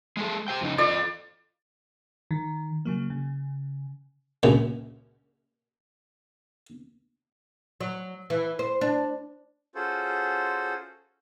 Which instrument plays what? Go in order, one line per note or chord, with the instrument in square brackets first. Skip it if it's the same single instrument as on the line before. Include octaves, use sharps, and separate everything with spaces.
[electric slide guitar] G#3 G#4 A4
G4 C5 G5
F2 C#3 D#4
[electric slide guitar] F4 A4 D#5 [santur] D5
[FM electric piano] D#3
C#3 F#3 A#3
C#3
[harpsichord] C#2 F#2 A#2 C#3
[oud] F#3
E3
C5
D4
[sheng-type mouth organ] C#4 F4 F#4 G#4 A4 C5